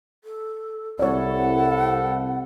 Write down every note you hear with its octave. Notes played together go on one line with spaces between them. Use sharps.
A4
C2 E4 A4 C#5 D5 F#5